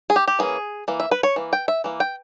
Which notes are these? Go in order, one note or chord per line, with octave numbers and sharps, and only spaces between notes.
G#4
G4
G4
E3 A#3 C#4 G#4
E3 A#3
E5
B4
C#5
E3 A#3
G5
E5
E3 A#3
G5